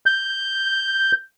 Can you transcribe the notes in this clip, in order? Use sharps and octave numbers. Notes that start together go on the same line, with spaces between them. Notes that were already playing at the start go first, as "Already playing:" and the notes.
G6